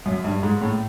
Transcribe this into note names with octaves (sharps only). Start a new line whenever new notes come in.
F#2
G2
G#2
A2